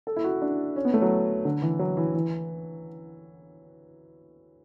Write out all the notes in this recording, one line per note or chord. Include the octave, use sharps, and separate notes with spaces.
A4
E4
F#4
D4
C#4
B3
A3
F#3
D3
E3
F#3
E3
E3